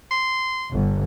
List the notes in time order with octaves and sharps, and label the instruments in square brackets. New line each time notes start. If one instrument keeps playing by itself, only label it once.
[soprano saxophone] C6
[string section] G1